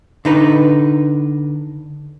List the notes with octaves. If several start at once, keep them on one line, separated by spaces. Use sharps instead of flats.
D3 D#4 B4